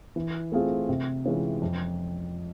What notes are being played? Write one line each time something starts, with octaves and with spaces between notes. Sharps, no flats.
E3
A3 C4 F4 G#4
C3
E3 G#3 C#4 F4
F2